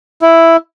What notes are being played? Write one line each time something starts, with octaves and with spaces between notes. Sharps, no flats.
E4